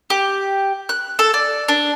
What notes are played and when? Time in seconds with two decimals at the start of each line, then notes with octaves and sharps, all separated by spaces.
0.10 G4
0.89 F#6
1.19 A4
1.34 D5
1.68 D4